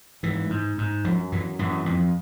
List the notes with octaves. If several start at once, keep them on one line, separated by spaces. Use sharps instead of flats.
G#2 E3
G#2
G#2
F#2 F3
F#2 E3
F#2 E3
F2